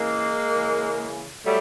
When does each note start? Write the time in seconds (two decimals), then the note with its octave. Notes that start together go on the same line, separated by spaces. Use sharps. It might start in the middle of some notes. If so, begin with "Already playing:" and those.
Already playing: C#3 E3 G#3 A#3
0.53 C#3 E3
1.45 F#3 G3 A3